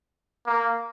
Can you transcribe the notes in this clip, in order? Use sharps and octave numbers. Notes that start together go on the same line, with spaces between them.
A#3